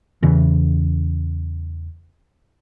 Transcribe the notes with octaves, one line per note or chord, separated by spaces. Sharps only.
E2 C#3 E3